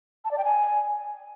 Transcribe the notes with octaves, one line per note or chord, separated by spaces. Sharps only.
A5
D5
G5
G#5